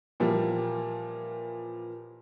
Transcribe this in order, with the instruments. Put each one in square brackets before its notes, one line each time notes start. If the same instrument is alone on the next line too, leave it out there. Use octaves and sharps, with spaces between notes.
[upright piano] A#2 E3 F3 G3 A#3